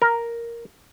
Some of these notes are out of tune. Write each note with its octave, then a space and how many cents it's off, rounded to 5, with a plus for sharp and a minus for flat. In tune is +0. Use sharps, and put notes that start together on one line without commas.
A#4 +0